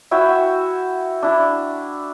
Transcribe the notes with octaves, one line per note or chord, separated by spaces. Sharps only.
E4 F#4 E5 G5
D4 E4